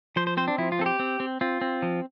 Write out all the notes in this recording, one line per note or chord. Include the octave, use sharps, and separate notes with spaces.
F3 C5
C5
C4 C5
D4
F3 E4
F4
C4 A4
G4
C4
C4
C4 F4
C4
F3